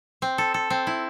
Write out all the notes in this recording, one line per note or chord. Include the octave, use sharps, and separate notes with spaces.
C4
A4
A4
C4
E4